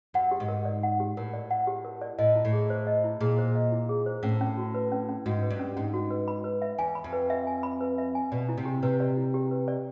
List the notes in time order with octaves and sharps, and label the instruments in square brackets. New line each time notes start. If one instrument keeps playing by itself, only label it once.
[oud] F#2 [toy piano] F#5
[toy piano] G4
[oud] G#2
[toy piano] A#4
D5
F#5
G4
[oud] A2 [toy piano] A#4
[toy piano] D5
F#5
G4
A#4
D5
[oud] A2 [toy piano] D#5
[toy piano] E4
[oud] A2
[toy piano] G#4
C5
D#5
E4
[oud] A#2 [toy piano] G#4
[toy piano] C5
D#5
E4
G#4
C5
[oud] A2 [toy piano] C#4
[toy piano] C#4
F#4
B4
C#4
C#4
[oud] G#2 [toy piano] F#4
[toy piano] B4
[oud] G2
[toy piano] C#4
[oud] G#2 [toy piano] C#4
[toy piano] F#4
B4
B5
B4
E5
[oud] E2 [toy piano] G#5
[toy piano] B5
[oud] F2
[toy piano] B4
E5
G#5
B5
B4
E5
G#5
[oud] B2 [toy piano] D5
[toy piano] E4
[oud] C3
[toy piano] G4
[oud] C3 [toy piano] B4
[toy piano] D5
E4
G4
B4
D5